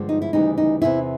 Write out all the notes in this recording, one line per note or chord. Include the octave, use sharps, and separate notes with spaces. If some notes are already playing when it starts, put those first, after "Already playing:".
Already playing: G2 D3 F3 G#3
D#4
E4
D2 C#3 E3 G3 D#4
D#4
E2 C3 E3 E4